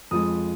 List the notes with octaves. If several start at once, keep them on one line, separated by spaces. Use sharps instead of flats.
F2 F3 G#3 D#6